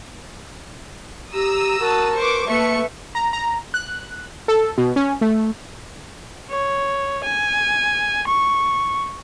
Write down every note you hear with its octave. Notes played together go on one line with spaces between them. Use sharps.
G4 A#5 D#6 E6
F#4 A#4 A5
B4 C5 C#6 D6
A3 A#3 B4 E5 C#6 C#7
A#5
A#5
F#6
A4
B2
C#4
A3
C#5
G#5
C#6